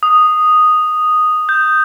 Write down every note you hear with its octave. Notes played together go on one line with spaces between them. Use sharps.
D#6
G6